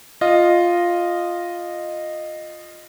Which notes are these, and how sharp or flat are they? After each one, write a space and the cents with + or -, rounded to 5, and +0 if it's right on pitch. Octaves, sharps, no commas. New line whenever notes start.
F4 +0 D#5 -10